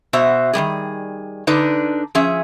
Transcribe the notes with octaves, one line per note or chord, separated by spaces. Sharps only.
B2 F#4 C5 E5
D#3 F3 G3 G#4
D3 D4 D#4 B4
F3 C#4 G#4 E5